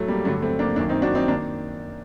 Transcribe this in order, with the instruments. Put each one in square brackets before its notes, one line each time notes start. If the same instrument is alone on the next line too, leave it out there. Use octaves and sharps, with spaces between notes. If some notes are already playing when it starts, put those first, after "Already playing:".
Already playing: [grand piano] A2 F#3 A3
G3 A#3
G2 D3 F#3 A3
A3 C4
A#3 D4
F#2 A#3 D4
D#3
C4 D#4
D4 F#4
C4 D#4
D#3 A#3 D4